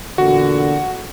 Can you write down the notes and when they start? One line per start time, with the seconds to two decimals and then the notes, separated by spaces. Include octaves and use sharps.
0.18 E2 A#2 D3 F#4